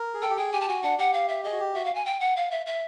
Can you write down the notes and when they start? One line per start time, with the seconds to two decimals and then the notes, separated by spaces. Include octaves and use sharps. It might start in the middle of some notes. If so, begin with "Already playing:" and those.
Already playing: A#4
0.14 G#4
0.21 A4 G5
0.30 G4
0.37 G#4 G5
0.52 G4 G#5
0.60 A5
0.67 F#4 G#5
0.83 D4 F#5
0.98 G4 F#5
1.13 F5
1.28 E5
1.44 G#4 D#5
1.52 F#4
1.60 G4
1.74 F#4 E5
1.85 F5
1.95 G#5
2.05 G5
2.20 F#5
2.36 F5
2.51 E5
2.66 E5